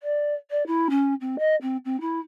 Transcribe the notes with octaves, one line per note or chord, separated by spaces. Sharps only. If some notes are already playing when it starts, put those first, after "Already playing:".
D5
D5
E4
C#4
C4
D#5
C4
C4
E4